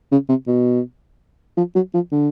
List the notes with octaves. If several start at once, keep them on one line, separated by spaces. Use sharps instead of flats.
C#3
C3
B2
F3
F#3
F3
D3